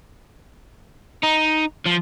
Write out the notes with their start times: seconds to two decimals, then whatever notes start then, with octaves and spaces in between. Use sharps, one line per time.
1.23 D#4
1.86 F3